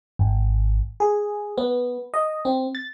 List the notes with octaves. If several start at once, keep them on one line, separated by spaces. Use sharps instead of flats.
G#1
G#4
B3
D#5
C4
A6